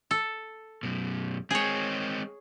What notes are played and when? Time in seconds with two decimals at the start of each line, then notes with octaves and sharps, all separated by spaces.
0.11 A4
0.83 F#2 B2
1.51 G#3 C4 G#4 C#5